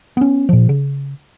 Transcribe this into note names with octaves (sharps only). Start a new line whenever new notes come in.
B3 C#4
A#2 F3
C#3